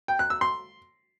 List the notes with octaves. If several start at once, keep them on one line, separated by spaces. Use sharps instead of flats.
G5
F#6
E6
C6